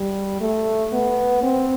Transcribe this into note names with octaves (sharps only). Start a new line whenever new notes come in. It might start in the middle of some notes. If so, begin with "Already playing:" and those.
Already playing: G3
A3
B3
C4